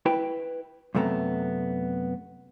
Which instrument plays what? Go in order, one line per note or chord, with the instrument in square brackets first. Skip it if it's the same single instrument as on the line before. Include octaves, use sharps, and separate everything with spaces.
[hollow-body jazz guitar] E4 B4 G5
F#2 C3 A3 B3 A#5